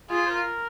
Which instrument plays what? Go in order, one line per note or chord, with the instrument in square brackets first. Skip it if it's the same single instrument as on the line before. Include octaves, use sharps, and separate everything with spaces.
[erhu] F4 [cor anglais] G#4
[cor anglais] C5
A#4